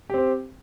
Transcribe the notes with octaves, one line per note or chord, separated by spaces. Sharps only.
C4 G4 C5